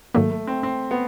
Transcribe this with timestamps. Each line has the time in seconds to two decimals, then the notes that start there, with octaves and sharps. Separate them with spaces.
0.14 G#2 D#3 F#3 A3 A#3
0.31 A3
0.47 C4
0.63 C4
0.91 B3